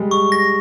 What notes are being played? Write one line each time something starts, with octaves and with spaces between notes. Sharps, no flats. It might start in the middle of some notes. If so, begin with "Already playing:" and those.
Already playing: G3 G#3
C#6
A#6